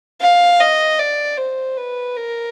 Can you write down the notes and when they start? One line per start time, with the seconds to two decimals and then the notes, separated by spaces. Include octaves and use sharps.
0.21 F5
0.60 D#5
0.99 D5
1.38 C5
1.77 B4
2.16 A#4